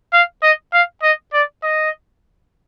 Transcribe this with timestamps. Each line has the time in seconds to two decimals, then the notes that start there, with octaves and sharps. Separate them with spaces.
0.14 F5
0.43 D#5
0.73 F5
1.03 D#5
1.33 D5
1.63 D#5